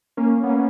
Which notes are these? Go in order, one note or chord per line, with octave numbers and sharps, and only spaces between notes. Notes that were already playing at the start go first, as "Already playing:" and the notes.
A#3 C#4
B3
A#3 C#4